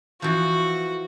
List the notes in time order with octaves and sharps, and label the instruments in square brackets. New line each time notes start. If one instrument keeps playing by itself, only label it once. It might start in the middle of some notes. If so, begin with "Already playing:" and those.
[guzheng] E3 F3 [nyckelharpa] F#4